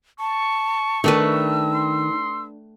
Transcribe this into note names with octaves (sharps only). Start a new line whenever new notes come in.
A5 C#6
D#3 A3 D4 B4 E6
C6